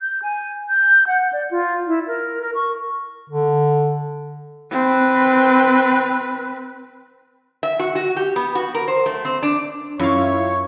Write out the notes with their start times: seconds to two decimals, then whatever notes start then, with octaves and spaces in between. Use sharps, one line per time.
0.02 G6
0.23 G#5
0.69 G6
1.07 F#5
1.33 D5
1.51 F4
1.87 E4
2.07 A#4
2.42 A#4
2.55 C#6
3.30 D3
4.71 C4 B4
7.63 E5
7.79 F#4
7.95 F#4
8.16 G4
8.36 B3
8.55 F#4
8.75 A#4
8.88 C5
9.06 A3
9.25 C4
9.43 D4
9.99 F#2 E4 F4 C#5 F5 C#6